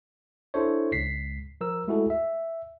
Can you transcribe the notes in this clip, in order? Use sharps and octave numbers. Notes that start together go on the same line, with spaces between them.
D4 E4 G#4 A4 C5 C#5
C#2 G#3 B6 C7
F3 A#4 E6
G#3 A3 E4 F#4 G#4 A4
E5